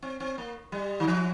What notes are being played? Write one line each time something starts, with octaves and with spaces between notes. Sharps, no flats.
C4
C4
A#3
G3
D#3
F3